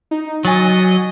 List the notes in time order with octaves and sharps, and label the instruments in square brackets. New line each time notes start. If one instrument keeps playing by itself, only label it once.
[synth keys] D#4
[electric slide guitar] F#3 [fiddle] D#5 [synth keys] G#5 A6